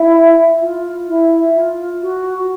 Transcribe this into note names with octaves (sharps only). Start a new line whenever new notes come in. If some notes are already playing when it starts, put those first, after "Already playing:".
Already playing: E4
F4
E4
F4
F#4